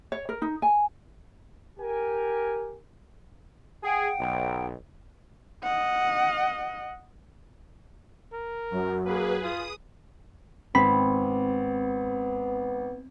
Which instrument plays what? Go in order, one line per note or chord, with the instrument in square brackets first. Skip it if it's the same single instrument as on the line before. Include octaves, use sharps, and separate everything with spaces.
[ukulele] C#5
A#4
D#4
G#5
[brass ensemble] G4 A#4 G#5
[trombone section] G#4 [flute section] F#5 G5
[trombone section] B1
[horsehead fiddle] D#5 F#5
[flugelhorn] A#4
[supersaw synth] F#2 [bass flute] F#3
[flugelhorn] A#3 [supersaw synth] G#4 B4
[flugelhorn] F4 [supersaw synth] D#6
[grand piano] G#1 [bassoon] B3 [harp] C4 [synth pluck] B5